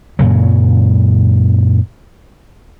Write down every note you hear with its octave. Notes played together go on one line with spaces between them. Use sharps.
F#2 A#2 C#3 F#3